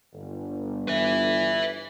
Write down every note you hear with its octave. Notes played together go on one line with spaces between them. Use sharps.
G1
B4 E5